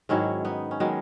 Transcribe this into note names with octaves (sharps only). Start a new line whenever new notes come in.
G#2 D#3 F#3 C#4 E4
B3 D#4
C#4
D#3 F#3 G#3 B3